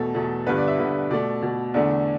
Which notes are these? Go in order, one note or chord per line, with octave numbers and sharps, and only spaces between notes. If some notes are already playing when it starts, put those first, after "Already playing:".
Already playing: E2 B2 A3 A4
E2 B2 A3
G2 D3 B3 B4
D5
E5
G2 D3 B3
B2 A3 D5
B2 A3
E2 D3 A3 D4